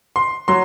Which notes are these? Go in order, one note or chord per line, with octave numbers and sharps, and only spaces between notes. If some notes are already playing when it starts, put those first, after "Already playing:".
C6
F#3 C6